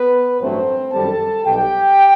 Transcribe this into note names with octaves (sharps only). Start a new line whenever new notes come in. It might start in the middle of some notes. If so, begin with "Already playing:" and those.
Already playing: B3 B4
A1 G2 F#3 A3 C4 C5
F#2 D#3 G3 A4 A5
B1 B2 G3 G4 G5